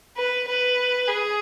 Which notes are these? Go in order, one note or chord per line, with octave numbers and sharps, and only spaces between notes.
B4
B4
G#4